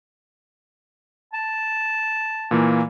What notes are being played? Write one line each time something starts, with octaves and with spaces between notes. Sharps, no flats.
A5
A#2 E3 A#3